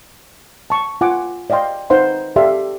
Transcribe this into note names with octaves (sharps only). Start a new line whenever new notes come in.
A5 C#6
F4 F#5 G#5 D6
D5 D#5 F5 G5 C6
D#4 B4 C5 F5 F#5 C6
G4 A4 D5 E5 F5 C6